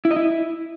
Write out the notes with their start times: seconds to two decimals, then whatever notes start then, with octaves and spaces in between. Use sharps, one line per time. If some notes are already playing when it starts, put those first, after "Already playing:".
0.05 E4
0.11 D#5
0.16 E4